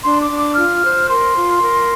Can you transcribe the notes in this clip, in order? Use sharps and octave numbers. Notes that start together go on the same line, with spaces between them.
D4 C6
D6
D4
D6
F4 F6
C5
A#4 C6
F4
A#4